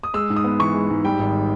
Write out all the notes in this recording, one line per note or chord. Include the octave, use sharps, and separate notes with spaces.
D#6
G#3 E6
G#2
D#6
B3
E3 C#6
G#3
G#2
G3 G5
G#1